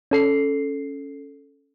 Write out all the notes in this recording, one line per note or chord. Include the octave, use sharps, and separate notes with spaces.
C#4 A4 C7